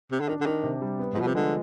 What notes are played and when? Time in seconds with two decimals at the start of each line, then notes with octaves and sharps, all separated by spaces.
0.11 C3
0.20 D3
0.29 D#3 D4
0.41 D3
0.46 D#3 D4
0.63 C3
0.82 G3
0.99 B3
1.14 G#2
1.17 B2 F3
1.27 C3
1.35 D3 G#3